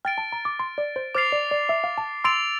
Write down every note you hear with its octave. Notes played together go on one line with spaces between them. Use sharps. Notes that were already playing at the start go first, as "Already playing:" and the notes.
G5 F6 A6 D7
A5
A#5
D6
C6
D5
C5
C5 D6 F6 A6 C7 F7
D5
D5
E5
F5
A5
C6 E6 A6 D7 F7